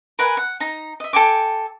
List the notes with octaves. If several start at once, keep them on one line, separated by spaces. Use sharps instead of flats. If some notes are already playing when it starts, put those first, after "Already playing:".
A#4 B4 F#5 G#5
F#5
D#4 A#5
D#5 E5
A4 G5 G#5 D6